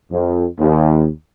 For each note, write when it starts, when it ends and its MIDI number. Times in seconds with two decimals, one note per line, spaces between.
0.11 0.46 41
0.59 1.06 39